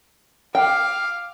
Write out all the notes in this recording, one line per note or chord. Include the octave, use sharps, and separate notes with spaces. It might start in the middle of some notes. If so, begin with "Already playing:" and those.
F5 G5 D6